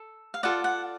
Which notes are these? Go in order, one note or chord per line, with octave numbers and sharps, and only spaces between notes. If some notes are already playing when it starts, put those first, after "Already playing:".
Already playing: A4
F5
F4 A4 D5 F#5
F#5